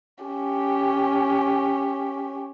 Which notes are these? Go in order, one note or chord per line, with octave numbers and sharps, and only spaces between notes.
C#4 G4